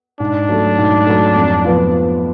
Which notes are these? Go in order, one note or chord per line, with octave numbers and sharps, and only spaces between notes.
G#2 D4
F#3 A3
G#2
F#3 A3
F2
F3 B3 F4